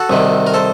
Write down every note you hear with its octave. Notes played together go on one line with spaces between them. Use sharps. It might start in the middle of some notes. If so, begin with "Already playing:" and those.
Already playing: F#4 A4
C2 C3 D#3
A#4
A4 C5